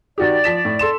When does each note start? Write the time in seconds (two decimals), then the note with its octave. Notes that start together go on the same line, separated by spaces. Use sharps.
0.18 D#3 F#4 G4 D5
0.44 F3 B6 E7
0.65 A2
0.79 A4 C6 E7